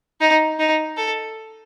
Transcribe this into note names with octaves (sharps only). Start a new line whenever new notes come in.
D#4
D#4
A4